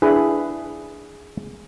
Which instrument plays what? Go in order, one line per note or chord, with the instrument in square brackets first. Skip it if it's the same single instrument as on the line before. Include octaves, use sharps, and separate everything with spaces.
[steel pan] D4 E4 B4 [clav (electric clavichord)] G#4